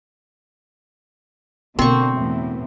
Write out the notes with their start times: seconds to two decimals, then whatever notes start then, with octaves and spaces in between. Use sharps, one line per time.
1.79 B2 D3 A#3 C4 C#6
2.15 E2 A2